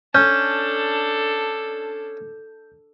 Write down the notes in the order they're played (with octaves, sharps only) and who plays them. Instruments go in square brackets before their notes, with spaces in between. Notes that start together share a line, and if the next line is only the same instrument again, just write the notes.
[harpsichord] C#4 [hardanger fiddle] D4 A4 [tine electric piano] G6